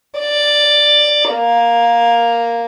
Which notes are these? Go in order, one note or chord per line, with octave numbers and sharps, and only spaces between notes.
D5
A#3